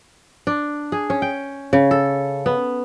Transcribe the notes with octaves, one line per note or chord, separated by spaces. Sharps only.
D4
G#4
C#4
G5
C#3
A4
B3